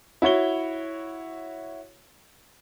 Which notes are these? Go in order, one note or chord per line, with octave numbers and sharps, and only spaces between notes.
E4 F#4 C#5 G7